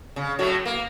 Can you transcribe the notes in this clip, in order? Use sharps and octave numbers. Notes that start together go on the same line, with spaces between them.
C#3
A2 F#3 A3
A#3